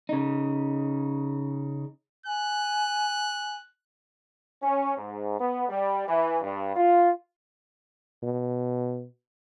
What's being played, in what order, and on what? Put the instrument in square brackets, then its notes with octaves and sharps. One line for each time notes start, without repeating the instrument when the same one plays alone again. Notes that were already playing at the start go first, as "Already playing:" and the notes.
[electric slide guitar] C#3 D#4
[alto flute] G#5 [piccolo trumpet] F#6
[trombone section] C#4
G#2
B3
G3
E3
G2
F4
[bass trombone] B2